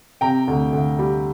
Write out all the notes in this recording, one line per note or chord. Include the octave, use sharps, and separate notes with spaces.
C3 G5 A#5
D2
D2
G3